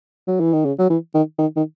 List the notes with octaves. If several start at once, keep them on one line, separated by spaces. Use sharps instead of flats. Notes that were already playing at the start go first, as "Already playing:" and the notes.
F#3
E3
D#3
C#3
F#3
E3
D#3
D#3
D#3